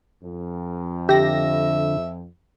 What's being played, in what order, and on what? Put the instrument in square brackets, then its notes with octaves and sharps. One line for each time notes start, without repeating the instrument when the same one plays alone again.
[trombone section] F2
[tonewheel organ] D3 [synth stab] G4 A#6 [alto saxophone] E5